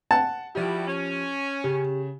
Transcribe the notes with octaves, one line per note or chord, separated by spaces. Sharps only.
F#5 A5
F3 G3 E4 F#4 G4
C#4
C#3 G4